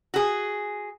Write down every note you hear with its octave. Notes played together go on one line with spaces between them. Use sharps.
F#4 G#4